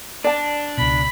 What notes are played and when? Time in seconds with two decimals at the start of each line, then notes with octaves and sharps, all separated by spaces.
0.24 D4 D5 A5
0.77 C#2 B2 B5